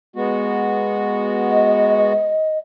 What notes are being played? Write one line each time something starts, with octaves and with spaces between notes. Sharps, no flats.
G#3 B3 F#4
D#5